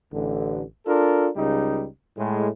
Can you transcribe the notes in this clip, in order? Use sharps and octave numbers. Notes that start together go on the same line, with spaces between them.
A1 D3
D4 F4 A4 A#4
C#2 C#3 G3 D#4
A2 G#3